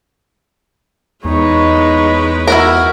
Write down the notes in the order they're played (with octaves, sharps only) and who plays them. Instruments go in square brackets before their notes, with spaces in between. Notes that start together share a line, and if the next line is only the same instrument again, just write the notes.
[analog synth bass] E2 [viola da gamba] G#3 B4 [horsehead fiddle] D#4 C#5
[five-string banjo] E4 F#4 A#4